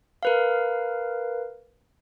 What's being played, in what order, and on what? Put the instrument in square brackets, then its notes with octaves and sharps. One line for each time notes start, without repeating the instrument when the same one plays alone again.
[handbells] A#4 B4 F5